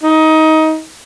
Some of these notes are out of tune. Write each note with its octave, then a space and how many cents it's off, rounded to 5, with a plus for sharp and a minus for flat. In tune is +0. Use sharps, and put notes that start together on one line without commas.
D#4 +20